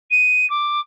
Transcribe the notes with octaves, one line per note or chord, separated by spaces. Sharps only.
D#7
D6